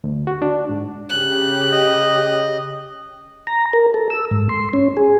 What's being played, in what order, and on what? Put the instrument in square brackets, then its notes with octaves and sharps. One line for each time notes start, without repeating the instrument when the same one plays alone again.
[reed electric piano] D2
F#4
D4
G#2
[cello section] C#3 G4 [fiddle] F#6
[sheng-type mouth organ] D#5
[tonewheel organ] A#5
A#4
A4
E6
G#2
C6
C#4
G#4